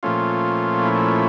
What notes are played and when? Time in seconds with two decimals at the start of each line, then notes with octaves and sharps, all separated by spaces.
0.03 A#2 F3 A3 C#4 F4
0.85 E4